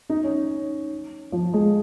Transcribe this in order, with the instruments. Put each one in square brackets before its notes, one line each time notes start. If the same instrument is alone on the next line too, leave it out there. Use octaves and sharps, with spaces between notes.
[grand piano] D#4
C#4
F3
G#3